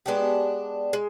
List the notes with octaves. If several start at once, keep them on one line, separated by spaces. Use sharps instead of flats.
G#3 B3 D4 G4
G#3